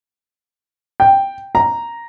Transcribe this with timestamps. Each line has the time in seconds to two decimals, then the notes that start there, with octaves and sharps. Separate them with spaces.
1.00 G5
1.55 A#5